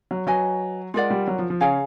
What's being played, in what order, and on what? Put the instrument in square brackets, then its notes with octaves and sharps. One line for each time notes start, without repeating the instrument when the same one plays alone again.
[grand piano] F#3
[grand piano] F#3 [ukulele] F#4 B4 D#5 G#5
[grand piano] G#3 [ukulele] F4 A#4 D5 F#5
[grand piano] G3
F#3
F3
F3
[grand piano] C#3 [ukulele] G#4 C#5 F5 G#5